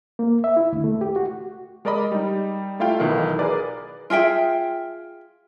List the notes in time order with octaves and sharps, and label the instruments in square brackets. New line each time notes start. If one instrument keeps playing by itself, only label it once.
[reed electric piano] A#3
E5
E4
D2
A3
G4
F#4
[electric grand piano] G#3 A#4 D5 D#5 B5
G3 D#4
A3 E4 F4 F5 G5
B1 B2 D#3 E3
G#4 A#4 B4 D5
[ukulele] F4 G#4 E5 G5